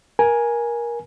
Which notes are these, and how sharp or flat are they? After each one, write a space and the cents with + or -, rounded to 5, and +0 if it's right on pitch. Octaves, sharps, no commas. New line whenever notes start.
A#4 +20 G#5 +0